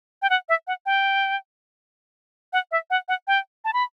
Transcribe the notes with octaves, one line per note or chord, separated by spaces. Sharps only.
G5
F#5
E5
F#5
G5
F#5
E5
F#5
F#5
G5
A5
B5